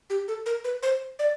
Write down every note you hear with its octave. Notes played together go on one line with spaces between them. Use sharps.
G4
A4
A#4
B4
C5
D5